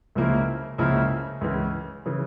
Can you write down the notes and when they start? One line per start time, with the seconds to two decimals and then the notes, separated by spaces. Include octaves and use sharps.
0.15 C#2 C#3 F3 A#3 E4
0.78 C#2 C#3 F3 A#3 E4
1.41 C#2 C#3 E3
2.06 C#3 E3